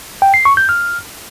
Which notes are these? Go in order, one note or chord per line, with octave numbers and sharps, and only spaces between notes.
G5
C7
C#6
G6
F6